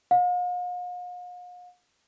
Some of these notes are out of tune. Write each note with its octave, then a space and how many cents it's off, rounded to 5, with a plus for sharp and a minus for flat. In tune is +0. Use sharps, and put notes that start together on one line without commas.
F5 +45